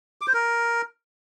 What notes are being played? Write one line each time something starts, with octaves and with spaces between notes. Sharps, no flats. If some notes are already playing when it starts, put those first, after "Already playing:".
D6
C5
A#4